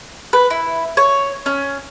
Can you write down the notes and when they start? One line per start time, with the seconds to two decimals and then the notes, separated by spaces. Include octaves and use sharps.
0.33 B4
0.50 E4
0.97 C#5
1.46 C#4